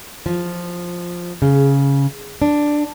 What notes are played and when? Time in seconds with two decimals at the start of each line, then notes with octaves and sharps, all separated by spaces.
0.26 F3
1.42 C#3
2.42 D4